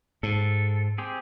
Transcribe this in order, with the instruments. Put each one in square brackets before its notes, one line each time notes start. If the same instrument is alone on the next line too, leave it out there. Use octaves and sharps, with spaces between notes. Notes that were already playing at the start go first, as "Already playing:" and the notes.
[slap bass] G#2 [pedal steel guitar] A4
[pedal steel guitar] C4 G4 G#4